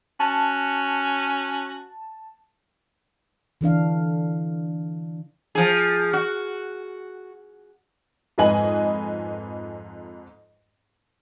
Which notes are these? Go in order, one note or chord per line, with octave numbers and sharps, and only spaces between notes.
C#4 F#4 A5
D3 E3 D4 F5
F3 G#4
F#4
F2 G#2 B4 D#5 G#5 F#7